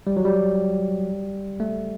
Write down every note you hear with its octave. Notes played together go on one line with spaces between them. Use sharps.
G3
F#3
G3
A3